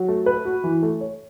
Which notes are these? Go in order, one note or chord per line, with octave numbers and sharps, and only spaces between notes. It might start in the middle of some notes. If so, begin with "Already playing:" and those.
Already playing: F#3
A3
B4
F#4
E3
A3
C#5